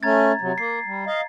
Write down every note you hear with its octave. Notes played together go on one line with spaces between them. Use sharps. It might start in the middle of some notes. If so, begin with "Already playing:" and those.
A3 C#4 A#5 G#6 A6
C3 F#3
A#3 C7
G3
D#5 F5